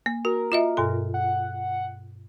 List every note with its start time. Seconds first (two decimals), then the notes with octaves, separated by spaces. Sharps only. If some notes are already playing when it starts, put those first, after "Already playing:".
0.06 A#3
0.25 F#4 A#4
0.52 F4 D#5 E5
0.77 G2 B2 A4
1.14 F#5